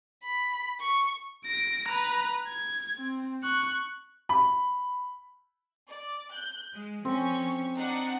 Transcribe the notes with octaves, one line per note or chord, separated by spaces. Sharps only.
B5
C#6
A#6 D7
B4 A#5
G#6
C4
C#6 F#6
B5
D5
F#6 G6
G#3
F3 C4 C#4 C#6
D4 D#4 F#5